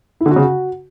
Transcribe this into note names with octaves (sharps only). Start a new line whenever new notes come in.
E4
D3
F#4
C#3
F#4